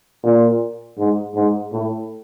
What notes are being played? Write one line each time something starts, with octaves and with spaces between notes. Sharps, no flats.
A#2
G#2
G#2
A2